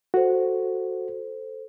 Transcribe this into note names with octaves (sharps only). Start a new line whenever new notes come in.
F#4 A4 C5